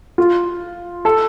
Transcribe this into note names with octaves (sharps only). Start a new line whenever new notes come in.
F4
A4